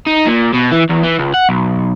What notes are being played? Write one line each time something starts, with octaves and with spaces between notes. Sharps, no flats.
D#4
A#2
B2
E3
E2
E3
C#2
F#5
B1